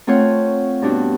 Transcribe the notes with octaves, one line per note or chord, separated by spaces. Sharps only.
A3 C4 F4 C#5 F#5
G2 B2 D4 F#4